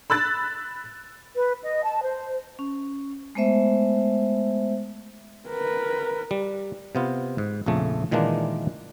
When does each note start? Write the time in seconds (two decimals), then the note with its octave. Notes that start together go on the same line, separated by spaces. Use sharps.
0.10 B5 E6 F#6 A6
1.35 B4
1.62 D#5
1.84 A5
2.03 C5
2.59 C#4
3.35 G#3 A3 B3 C5 E5
5.49 A#4 B4
6.31 G3
6.95 C3 B3 F4
7.38 G#2
7.66 A#1 F2 C#3 A3
8.11 A#2 D#3 E3 G#3 A#3 D4